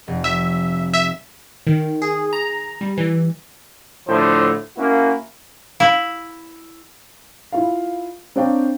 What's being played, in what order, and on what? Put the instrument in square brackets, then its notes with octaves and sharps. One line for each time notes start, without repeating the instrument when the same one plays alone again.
[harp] F1
[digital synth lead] E5
E5
[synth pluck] D#3
G#4
A#5
G3
E3
[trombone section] A2 D3 F3 C5
A#3 C#4 E4 F#4
[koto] E4 [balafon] F5
[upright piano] E4 F4 F5
C4 D4 C#5 F5 G5 A#5